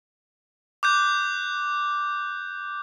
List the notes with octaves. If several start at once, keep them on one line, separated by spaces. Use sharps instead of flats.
D6 F#6 G6